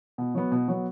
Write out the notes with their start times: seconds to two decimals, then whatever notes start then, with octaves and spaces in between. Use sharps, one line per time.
0.18 B2
0.35 F#3 B3
0.52 B2
0.68 F#3 B3